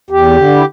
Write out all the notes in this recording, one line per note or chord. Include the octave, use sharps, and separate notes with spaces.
E2 G4
D3
E4